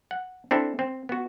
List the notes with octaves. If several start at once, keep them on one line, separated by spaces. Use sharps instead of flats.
F#5
C4 D4 E4 A4
C4
B3 F#4